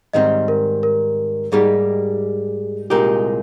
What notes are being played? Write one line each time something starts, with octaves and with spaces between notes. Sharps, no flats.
G#2 D#3 G3 C4 D#5
A#4
A#4
G#2 G3 A#3 D#4 G4 G#4
C2 A#2 G#3 D#4 G4 A#4